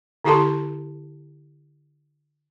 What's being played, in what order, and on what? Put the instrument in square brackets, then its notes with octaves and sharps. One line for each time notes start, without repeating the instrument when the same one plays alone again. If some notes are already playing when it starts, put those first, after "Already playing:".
[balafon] D3 E4 G4 A4 A5 C6